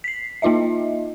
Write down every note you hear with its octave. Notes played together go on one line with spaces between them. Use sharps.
B6 C7
A#3 D#4 F4 D#5 E5